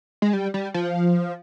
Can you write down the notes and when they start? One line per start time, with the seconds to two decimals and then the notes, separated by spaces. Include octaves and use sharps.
0.22 G#3
0.33 G3
0.54 G3
0.74 F3